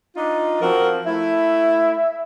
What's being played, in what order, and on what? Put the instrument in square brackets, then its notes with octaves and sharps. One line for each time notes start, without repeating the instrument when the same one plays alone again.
[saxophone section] D4 D#4 F4
[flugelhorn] F3 [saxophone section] C4 F#4 A#4
[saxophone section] A3 E4 [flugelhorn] E5